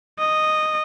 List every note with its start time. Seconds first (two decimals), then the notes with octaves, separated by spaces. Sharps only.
0.19 D#5